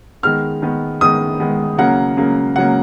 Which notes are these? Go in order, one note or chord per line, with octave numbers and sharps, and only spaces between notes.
D#3 G#3 B3 F6
D#3 G#3 B3
D#3 G#3 B3 D#6
D#3 G#3 B3
C#3 F#3 A#3 F#5
C#3 F#3 A#3
C#3 F#3 A#3 F#5